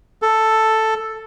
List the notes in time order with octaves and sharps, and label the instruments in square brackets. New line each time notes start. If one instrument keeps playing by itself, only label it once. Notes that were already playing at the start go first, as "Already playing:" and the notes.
[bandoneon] A4